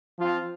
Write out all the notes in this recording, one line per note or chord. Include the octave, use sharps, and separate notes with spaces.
F3 C4 F4